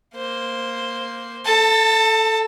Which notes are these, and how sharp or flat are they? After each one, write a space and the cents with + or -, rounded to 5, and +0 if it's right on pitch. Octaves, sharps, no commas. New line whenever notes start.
A#3 +0 C5 +0
A4 +0 A5 +30